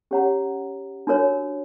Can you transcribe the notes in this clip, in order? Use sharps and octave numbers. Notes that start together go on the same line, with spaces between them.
C#4 G4 C#5 F#5 A#5
D4 F#4 A#4 C#5